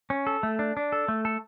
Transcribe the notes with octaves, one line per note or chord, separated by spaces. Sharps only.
C#4
A4
A3
D4
D4
A4
A3
A4